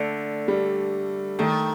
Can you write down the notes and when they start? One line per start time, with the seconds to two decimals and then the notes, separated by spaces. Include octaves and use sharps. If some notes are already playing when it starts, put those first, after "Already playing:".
Already playing: D3 A3
0.48 G3
1.39 D#3 A3